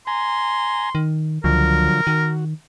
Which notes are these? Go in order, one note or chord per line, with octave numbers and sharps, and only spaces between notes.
G#5 A#5 C6
D#3
C#2 D3 F3 F#3 A#4
D#3 F#4